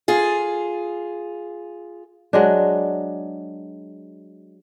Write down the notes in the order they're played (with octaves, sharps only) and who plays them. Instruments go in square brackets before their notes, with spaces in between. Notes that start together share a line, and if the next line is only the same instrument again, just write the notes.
[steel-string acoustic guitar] F4 G#4
[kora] F#3 G#3 D4